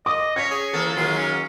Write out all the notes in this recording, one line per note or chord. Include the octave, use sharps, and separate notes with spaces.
D#5 D6 D#6
C#4 C#5 C#6 G#6 A#6 B6
G#4
E3 A#3 A4
D#3 F#3 A#3 F4 G#4
C#4